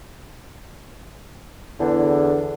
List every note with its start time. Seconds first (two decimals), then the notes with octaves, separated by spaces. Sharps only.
1.80 E2 D3